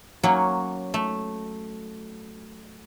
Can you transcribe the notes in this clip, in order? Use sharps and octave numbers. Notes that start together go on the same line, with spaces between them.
F#3 A#3 C#4 C#5
A3